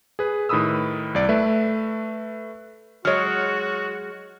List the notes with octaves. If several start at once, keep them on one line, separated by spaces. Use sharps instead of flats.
G#4 B4
A2 D#3 B4 B5 D#6 E6
C2 D5 D7
A3 B4 E5
F#3 G#3 F#4 C#5 F6